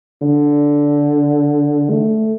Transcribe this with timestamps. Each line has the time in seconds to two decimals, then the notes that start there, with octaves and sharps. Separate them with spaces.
0.22 D3
1.90 A3